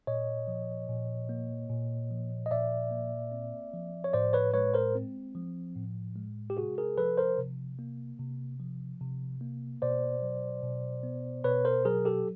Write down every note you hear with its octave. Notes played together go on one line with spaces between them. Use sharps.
A#2 C#5 D#5
F3
A#2
A#3
A#2
F3
D#5
A#2 D5 E5
A#3
C4
F3
C#5
A2 C5 D5
B4 C#5
G#3 B4 C#5
A#4 C5
C4
F3
A2
G#3
G4
C3 F#4 G#4
G#4 A#4
F3 A4 B4
A#4 C5
C3
A#3
C3
F3
C3
A#3
B2 C5 D5
F#3
B2
B3
B2 B4 C#5
A#4 C5
F#3 G#4 A#4
G4 A4